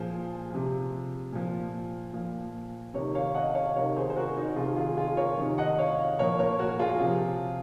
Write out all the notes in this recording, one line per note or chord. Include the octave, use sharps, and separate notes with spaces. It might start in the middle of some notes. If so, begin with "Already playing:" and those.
Already playing: A#2 F3 G#4 C5
C3 F3
A#2 F3
A#2 F3
C3 D#3 A#4 C#5
C#5 F5
D#5 F#5
C#5 F5
C3 D#3 A#4 C#5
G#4 C5
C5
F#4 A#4
D#4 F#4
C3 D#3 F4 G#4
F4 G#4
F4 G#4
A#4 C#5
C3 D#3
D#5 F#5
C#5 F5
A#2 F3 A#4 C#5
A#4 C#5
F#4 A#4
F4 G#4
C3 F3